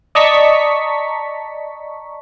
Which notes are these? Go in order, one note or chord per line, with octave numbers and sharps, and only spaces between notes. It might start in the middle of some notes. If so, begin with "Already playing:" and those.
D5 D#5 A5 A#5 C#6 B6